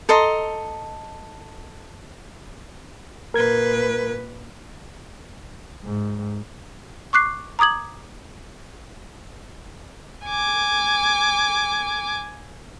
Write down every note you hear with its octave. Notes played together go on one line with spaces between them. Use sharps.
A4 D#5 A#5 C6
A#2 A#4 B4 G#6
G#2
C#6 D6 F#6 C7
A#5 D6 D#6 G#6 F#7
G#5 D6